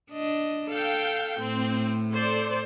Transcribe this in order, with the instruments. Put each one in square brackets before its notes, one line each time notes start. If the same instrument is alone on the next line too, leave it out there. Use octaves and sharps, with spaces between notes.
[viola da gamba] D4 D#5
[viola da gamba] A4 [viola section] F5 G5
[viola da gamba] A2 [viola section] C4
[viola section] A4 C5 D5